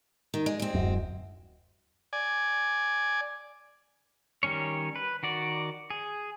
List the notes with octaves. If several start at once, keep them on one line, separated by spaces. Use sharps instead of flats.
D#3
G#3
G#3 C4
D1 F#2
D5 G#5
D#3 G3 C#4 C#5
B4
D#3 F#4 D5
G#4